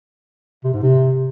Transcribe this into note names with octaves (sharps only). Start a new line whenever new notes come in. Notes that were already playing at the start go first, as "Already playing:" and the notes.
C3
G#2
C3